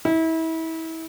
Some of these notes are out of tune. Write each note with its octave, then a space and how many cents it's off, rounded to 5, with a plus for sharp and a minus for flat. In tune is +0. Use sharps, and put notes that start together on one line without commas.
E4 -30